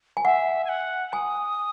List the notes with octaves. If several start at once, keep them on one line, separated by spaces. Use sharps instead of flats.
G#5
E5 F#5
G#5
F#5
G#5 D#6